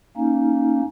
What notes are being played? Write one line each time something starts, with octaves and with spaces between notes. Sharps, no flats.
A#3 C#4 D#4